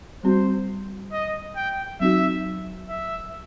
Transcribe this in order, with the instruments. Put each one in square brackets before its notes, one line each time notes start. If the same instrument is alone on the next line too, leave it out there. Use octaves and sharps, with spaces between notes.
[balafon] G3 C4 F#4 [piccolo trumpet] C5
[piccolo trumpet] D#5
G5
[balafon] F#3 C4 D#4 F#4 [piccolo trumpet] E5
[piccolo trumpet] E5